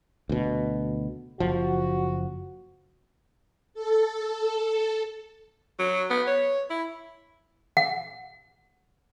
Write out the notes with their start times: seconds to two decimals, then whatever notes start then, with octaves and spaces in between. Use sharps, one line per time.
0.29 D2 B2
1.40 F#1 F3 F#4
3.74 A4
5.79 F#3
6.10 B3
6.27 C#5
6.70 E4
7.77 F#5